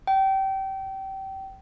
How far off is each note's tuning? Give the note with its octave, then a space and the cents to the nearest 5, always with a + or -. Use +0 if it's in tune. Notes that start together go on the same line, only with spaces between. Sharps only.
G5 -25